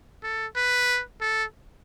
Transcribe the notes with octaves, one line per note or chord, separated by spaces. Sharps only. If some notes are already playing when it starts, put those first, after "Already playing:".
A4
B4
A4